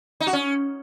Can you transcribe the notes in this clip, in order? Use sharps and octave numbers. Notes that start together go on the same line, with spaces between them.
D#4
F#4
C#4